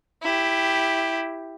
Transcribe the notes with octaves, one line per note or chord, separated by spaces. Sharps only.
E4 G4